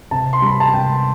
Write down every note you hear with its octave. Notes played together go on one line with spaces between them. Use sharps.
C3 A5
C6
G3 B5
A5
C3 G5